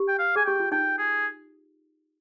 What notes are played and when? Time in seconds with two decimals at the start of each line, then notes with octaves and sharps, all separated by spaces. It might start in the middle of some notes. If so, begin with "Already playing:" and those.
Already playing: G4
0.08 G5
0.19 F5
0.36 G#4 G#5
0.45 G4 G5
0.60 F4
0.72 D#4 G5
0.98 G#4